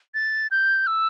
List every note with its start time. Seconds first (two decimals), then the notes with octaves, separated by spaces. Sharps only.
0.14 A6
0.51 G6
0.87 E6